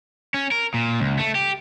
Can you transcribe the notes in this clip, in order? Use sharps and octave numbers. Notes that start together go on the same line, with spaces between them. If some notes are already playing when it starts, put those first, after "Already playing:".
C#4
A#4
A#2
C#2
A3
G4